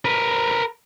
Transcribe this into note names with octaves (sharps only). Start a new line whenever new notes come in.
A#4 B4